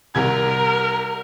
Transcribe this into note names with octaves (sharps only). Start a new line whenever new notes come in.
C2 C3 A#4 G#6